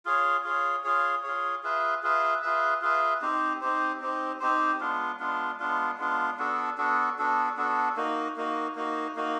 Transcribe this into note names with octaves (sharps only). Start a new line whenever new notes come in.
F4 G#4 C#5
F4 G#4 C#5
F4 G#4 C#5
F4 G#4 C#5
F4 G#4 B4 E5
F4 G#4 B4 E5
F4 G#4 B4 E5
F4 G#4 B4 E5
C4 D#4 G4 C5
C4 D#4 G4 C5
C4 D#4 G4 C5
C4 D#4 G4 C5
G#3 B3 D4 F4
G#3 B3 D4 F4
G#3 B3 D4 F4
G#3 B3 D4 F4
B3 D4 F#4 A4
B3 D4 F#4 A4
B3 D4 F#4 A4
B3 D4 F#4 A4
A#3 D#4 F#4
A#3 D#4 F#4
A#3 D#4 F#4
A#3 D#4 F#4